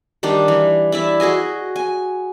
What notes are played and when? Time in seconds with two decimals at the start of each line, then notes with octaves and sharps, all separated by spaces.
0.23 D#3 G3 D4
0.48 E3
0.92 E4 D5 E5
1.20 F#4 G#4 D#5 G#5
1.76 G#5